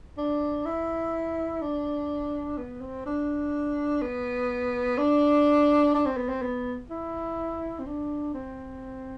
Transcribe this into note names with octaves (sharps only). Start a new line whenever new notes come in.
D4
E4
D4
B3
C4
D4
B3
D4
D4
C4
B3
C4
B3
E4
C4
D4
C4